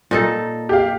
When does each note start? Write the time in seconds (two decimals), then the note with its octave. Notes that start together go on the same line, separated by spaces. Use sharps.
0.11 A#2 D#4 A4
0.69 G4 F5